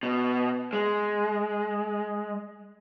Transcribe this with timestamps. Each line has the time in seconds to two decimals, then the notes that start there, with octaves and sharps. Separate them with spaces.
0.03 B2
0.73 G#3